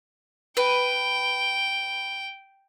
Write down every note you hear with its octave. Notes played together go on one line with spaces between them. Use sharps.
B4 G5